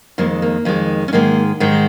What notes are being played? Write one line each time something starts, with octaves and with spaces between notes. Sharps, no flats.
F2 D#3 G#3 A#3
A#3
F2 D#3 G#3
C#4
G#2 D#3 G#3 A#3
G#2 D#3 G#3